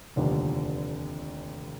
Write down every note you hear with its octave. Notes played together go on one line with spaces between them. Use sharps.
F1 D#2 D3 F3